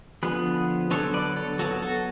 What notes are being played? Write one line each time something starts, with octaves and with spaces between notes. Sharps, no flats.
D3 F3 B3 G#4 B4
D3 F#3 B3 A4 C#5
B4 D5
A4 C#5
F#3 B3 F#4 A4
F#4 A4